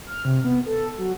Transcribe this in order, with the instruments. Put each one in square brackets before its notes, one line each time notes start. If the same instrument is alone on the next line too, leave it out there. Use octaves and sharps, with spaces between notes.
[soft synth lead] F6
C3
B3
A4
F#3